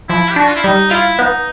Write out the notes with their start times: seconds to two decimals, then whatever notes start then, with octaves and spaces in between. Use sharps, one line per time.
0.09 F3 E4
0.30 G4
0.36 D4 F#4
0.47 F4
0.56 E4
0.63 G3 D#4
0.91 E4 F4
1.18 B3 D#4